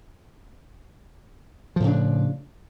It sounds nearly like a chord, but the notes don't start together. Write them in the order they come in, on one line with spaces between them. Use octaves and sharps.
F3 A2 C#3 D4